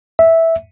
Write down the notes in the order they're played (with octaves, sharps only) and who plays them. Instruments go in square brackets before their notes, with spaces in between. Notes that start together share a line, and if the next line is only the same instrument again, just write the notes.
[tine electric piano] E5